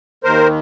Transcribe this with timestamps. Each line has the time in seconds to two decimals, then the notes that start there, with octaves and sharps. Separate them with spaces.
0.24 D#2 D#3 A#4 C5